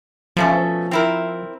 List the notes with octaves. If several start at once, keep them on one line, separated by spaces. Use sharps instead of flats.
B2 F3 A3 C#4
C4 E4 A#4